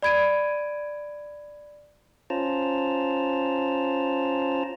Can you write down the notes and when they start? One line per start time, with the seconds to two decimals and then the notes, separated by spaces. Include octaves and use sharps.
0.02 D5 B5 G#6 D7 D#7
2.30 C#4 F4 C5 A5 A#5